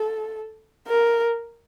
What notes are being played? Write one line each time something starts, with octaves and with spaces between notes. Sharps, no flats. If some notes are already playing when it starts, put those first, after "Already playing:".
Already playing: A4
A#4